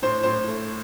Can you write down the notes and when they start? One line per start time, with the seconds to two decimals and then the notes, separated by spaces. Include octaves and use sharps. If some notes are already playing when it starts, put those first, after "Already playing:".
0.02 A2 C5
0.23 A2 C5
0.48 A3